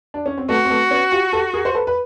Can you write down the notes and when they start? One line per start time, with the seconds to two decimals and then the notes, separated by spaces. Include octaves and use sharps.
0.14 D4
0.26 C#4
0.38 C4
0.49 A3 B3 F#4
0.65 C4
0.70 A3 B3
0.91 B3 C#4
1.12 F4 G4
1.32 G4 A4
1.54 G#4 A#4
1.65 C5
1.75 A4 B4
1.87 B4